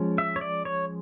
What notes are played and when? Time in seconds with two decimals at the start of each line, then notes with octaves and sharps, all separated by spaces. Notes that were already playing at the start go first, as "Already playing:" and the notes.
Already playing: F3 G#3 C#4
0.18 E5
0.36 C#5
0.41 D5
0.65 C#5